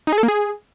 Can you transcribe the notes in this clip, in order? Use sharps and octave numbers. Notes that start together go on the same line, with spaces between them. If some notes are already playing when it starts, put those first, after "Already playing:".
D#4
G#4
A4
A#3
G#4